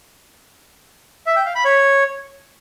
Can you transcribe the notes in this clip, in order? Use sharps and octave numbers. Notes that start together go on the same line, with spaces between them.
E5
G5
F5
B5
C#5